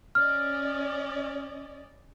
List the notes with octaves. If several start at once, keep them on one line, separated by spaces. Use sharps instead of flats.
C#4 D5 D#5 F6